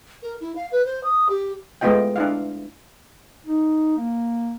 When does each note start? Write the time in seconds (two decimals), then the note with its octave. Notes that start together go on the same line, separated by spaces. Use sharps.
0.22 A#4
0.41 E4
0.56 F5
0.72 B4
0.86 C5
1.04 D#6
1.29 G4
1.81 G#3 A3 B3 F4 D#5 G5
2.16 D4 E4 F5
3.46 D#4
3.97 A#3